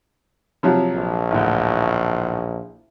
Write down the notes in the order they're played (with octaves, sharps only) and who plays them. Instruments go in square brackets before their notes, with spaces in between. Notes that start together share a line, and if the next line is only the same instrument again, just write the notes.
[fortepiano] C3 F3 F#3
[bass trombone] A#1
[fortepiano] A1 D2